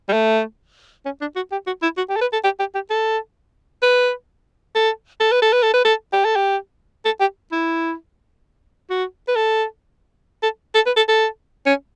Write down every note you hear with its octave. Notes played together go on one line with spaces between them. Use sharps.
G3
A3
C#4
D4
F#4
G4
F#4
E4
F#4
G4
A4
B4
A4
G4
G4
G4
A4
B4
A4
A4
B4
A4
B4
A4
B4
A4
G4
A4
G4
A4
G4
E4
F#4
B4
A4
A4
A4
B4
A4
A4
C#4